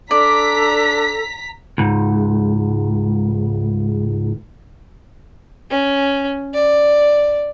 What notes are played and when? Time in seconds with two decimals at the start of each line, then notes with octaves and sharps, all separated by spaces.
0.11 D4 A4 D5 A#5 B6
1.78 C#2 G#2
5.70 C#4
6.54 D5